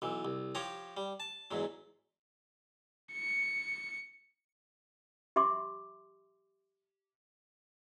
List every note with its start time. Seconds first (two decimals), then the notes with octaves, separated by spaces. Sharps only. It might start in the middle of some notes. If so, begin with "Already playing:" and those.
0.02 B1 E3
0.25 C2
0.55 F3 G4 C#5 A#5
0.97 G3
1.20 A5
1.51 E2 G#2 F#3
3.13 C#7
5.36 G4 E5 C6 D6